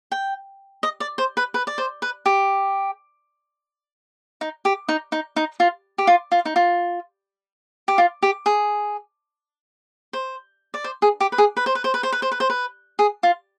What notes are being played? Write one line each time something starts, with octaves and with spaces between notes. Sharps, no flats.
G5
D#5
D5
C5
B4
B4
D5
C5
B4
G4
D#4
G4
D#4
D#4
D#4
F4
G4
F4
F4
D#4
F4
G4
F4
G4
G#4
C5
D5
C5
G#4
G4
B4
G#4
B4
C5
B4
C5
B4
C5
B4
C5
B4
C5
B4
G#4
F4